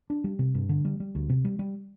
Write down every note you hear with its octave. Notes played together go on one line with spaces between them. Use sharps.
D4
G3
C3
G2
D3
G3
G3
D2
C3
G3
G3